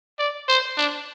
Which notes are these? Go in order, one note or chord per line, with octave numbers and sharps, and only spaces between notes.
D5
C5
D4